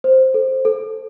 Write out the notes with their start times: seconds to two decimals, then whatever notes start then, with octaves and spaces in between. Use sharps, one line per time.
0.04 C5
0.34 A4
0.65 A4